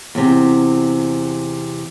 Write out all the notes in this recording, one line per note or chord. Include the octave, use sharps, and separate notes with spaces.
E2 C3